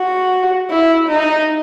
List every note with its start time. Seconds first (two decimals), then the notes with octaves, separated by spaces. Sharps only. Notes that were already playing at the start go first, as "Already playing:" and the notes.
Already playing: F#4
0.70 E4
1.09 D#4